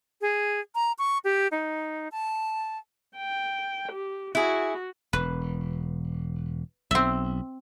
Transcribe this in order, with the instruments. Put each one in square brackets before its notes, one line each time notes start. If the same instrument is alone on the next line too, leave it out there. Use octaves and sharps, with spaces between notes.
[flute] G#4
A#5
C#6
G4
D#4
A5
[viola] G5
G4
[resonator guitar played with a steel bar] E4 G#4 [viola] F#4
[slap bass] E1 [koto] B4
[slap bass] B1 [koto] C4 E5